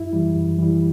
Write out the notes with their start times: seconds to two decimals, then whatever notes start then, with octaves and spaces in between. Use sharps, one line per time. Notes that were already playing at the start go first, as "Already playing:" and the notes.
Already playing: F#2 E4
0.13 E3 G3
0.35 F#2
0.58 E3 G3